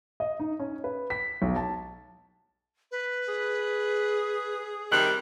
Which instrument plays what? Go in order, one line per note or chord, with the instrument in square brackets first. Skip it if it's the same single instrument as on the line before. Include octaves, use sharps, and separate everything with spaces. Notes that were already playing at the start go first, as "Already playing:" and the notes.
[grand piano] D#5
D#4
C#4
B4
B6
B1
A5
[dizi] B4
[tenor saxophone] G#4
[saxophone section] C3 D#3 G3 [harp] F#6